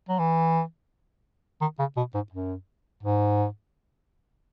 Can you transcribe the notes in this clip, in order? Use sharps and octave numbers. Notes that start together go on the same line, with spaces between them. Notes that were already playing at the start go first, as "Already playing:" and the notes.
F#3
E3
D#3
C#3
B2
G#2
F#2
G#2